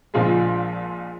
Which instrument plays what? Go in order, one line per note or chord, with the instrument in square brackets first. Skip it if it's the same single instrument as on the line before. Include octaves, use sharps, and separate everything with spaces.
[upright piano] A#1 A#2 F3 G#3